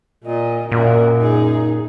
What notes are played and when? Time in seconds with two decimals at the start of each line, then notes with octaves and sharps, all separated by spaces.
0.24 A#2 A#3 D#5
0.72 F#2 A#2 F#4 A#4
1.20 D#4 G#4